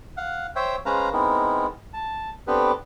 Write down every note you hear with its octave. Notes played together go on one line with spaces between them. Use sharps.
F5 F#5
C5 C#5 E5 G5
G#3 C#4 B4 C5 F5 A#5
G#3 B3 C4 D#4 E4 A#4
A5
B3 C4 D4 G4 A4 B4